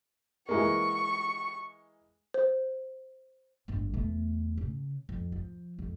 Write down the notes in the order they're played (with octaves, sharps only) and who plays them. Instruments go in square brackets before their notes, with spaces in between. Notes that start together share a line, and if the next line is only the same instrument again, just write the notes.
[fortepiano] E3 G#3 A#3 [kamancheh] C#6
[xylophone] C5
[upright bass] G1 G2
E2 A3
C#3
F2
F3
F2